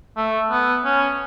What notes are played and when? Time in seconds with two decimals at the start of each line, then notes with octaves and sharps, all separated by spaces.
0.17 A3
0.51 B3
0.85 C#4